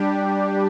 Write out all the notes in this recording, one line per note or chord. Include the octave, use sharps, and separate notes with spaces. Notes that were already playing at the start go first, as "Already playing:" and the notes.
Already playing: G3 D4 G4